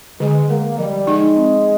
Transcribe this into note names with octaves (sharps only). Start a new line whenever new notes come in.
D3 G#3
G#3 A#3
F3 G3
G#3 D#4
C4